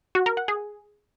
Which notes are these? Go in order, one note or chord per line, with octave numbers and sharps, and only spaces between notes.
F#4
A#4
F#5
G#4